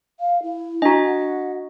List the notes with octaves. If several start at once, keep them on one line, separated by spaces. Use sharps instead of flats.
F5
E4
D4 F#4 D#5 A#5
F#5